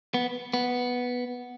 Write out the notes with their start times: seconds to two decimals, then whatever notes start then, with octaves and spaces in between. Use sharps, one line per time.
0.14 B3
0.53 B3